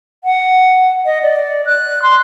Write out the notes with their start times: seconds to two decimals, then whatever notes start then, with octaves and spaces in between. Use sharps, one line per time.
0.24 F#5
1.06 D#5
1.23 D5
1.66 F#6
2.02 C6